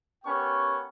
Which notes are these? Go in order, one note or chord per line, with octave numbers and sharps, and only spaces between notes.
B3 C#4 G4 A#4 G5 C#6